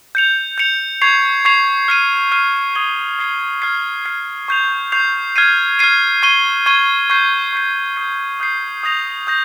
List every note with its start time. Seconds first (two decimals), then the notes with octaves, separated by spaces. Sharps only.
0.15 G6 C#7 F7
0.58 G6 C#7 F7
1.02 C#6 G#6 C7 F7
1.45 C#6 G#6 C7 F7
1.88 F6 C7 D#7
2.32 F6 C7 D#7
2.75 D#6 G#6 C7 G7
3.19 D#6 G#6 C7 G7
3.62 F6 G#6 C7
4.05 F6 G#6 C7
4.48 C#6 G6 C7 F7
4.92 C#6 G6 C7 F7
5.36 F6 G#6 C7 D#7
5.79 F6 G#6 C7 D#7
6.23 C#6 G#6 D#7 G7
6.66 C#6 G#6 D#7 G7
7.10 C#6 G6 C7
7.53 C#6 G6 C7
7.97 D#6 G6 C7
8.40 D#6 G6 C7
8.83 D#6 G6 A#6 F7
9.27 D#6 G6 A#6